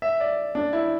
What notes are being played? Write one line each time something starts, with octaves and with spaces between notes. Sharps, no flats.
E5
D5
D4
E4